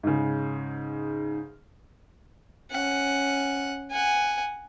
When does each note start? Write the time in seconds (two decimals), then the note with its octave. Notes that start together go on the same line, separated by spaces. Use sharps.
0.03 G#2 C#3
2.71 C#4 F#5
3.91 F#5 G#5